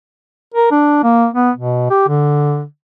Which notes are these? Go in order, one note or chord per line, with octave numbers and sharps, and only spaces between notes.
A#4
D4
A#3
B3
B2
G4
D3